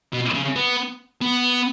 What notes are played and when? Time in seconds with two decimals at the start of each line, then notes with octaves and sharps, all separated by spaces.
0.13 B2
0.34 C#3
0.56 B3
1.22 B3